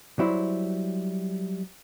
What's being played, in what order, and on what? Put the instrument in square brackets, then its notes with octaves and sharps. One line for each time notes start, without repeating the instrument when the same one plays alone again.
[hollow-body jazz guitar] F#3 G3 E4 C5